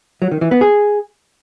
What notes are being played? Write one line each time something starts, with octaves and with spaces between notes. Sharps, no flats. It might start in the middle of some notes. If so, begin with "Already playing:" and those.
F#3
D#3
E3
B3
G#4